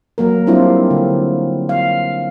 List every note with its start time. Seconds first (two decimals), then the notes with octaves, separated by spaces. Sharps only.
0.18 F#3 A#3 A#4
0.47 F#3 G3 C4 D4 E4 F4
0.90 D3
1.69 F5